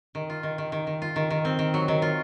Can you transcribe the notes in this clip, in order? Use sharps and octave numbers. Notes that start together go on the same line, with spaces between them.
D#3
F4
D#3
D#3
D#3
D#3
F4
D#3
D#3
C4
D#3
F#3
D#3
F4